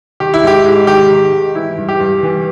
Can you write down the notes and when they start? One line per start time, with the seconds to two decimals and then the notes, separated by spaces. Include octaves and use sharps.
0.20 D#3 G4
0.34 E4
0.43 G#2 G4
0.65 G#2
0.87 D#3 G4
1.10 D#3
1.32 G#2
1.55 E3 E4
1.78 G2
1.89 G4
2.00 G2
2.23 E3